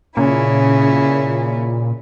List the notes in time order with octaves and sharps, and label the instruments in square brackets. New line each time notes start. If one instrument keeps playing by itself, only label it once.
[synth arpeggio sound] A#2 [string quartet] C#3 C#4 E4